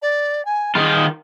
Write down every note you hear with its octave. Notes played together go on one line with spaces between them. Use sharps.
D5
G#5
D#3 F4 G#4